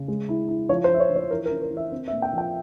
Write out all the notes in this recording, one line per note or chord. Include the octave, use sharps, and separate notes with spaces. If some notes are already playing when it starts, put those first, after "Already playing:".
Already playing: C#3
G#3
E4
E4
F3 C#5
C5
F3 E5
C#5
F3
C#5
E3 A#4
A#4
C#4
A#4
E3
E5
C4
E5
A#2
G5
F3 G5